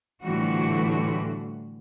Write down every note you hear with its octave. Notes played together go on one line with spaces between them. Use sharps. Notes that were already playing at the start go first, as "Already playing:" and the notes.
A2 D3 E3 F3 G3 F#4